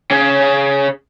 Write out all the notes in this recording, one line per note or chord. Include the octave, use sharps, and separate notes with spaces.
C#3 C#4